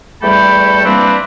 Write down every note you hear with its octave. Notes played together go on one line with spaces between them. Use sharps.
E2 G3 A3 A4 G5 B5
E3 G3 A#3 C4 D4 B4